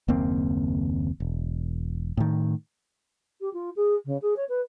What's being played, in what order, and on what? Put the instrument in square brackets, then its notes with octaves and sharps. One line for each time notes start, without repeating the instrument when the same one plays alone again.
[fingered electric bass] F#1 D#2 A#3 C4
E1
A2 D#3
[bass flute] G4
F4
G#4
C#3
G#4
C#5
B4